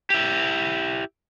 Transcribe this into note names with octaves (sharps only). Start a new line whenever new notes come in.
E4 G4